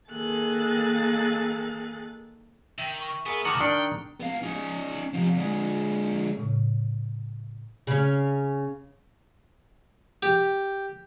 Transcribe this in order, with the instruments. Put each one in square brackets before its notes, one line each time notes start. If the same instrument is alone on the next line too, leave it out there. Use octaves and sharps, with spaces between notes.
[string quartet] D#3 A#3 G#4 A4 F#6 A6
[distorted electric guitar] D#3 [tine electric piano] E5 G5
[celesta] C#6
[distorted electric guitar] B3 [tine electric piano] G#4 A#4 E5
[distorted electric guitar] C#2 F#4 [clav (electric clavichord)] D#3 F#5 [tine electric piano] A5 F6 [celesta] D6 D#6
[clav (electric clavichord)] D#3 D4 D5 [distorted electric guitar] G5 [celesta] C#7
[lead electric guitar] B3 F5
C#4 D#4
C3 F3
D3 G#3
[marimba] A2 C#3
[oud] C#3 C#4
[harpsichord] G4